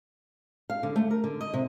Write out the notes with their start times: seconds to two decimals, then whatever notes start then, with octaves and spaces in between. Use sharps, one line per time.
0.70 F5
0.83 D3
0.96 A3
1.11 A#4
1.24 D3
1.41 D#5
1.54 C3